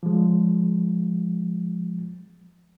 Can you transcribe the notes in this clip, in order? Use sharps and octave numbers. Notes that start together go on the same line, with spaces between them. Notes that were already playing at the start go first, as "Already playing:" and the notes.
F3 G#3